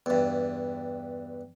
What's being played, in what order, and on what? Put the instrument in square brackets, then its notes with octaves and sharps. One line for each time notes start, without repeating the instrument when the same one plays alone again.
[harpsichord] E2 G2